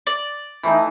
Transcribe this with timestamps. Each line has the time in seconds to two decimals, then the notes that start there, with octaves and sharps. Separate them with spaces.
0.07 D5
0.63 E3 A3 D#4